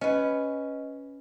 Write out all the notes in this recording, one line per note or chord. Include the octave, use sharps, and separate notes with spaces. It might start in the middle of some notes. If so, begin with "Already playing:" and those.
C#4 B4 D#5